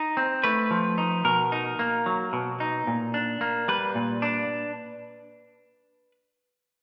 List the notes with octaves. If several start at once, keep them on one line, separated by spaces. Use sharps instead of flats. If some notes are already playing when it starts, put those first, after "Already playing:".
Already playing: D#4
C4
A3 B4
F3
D#4
B2 A#4
D#4
A#3
F#3
B2
D#4
A#2
D4
A#3
G3 B4
A#2
D4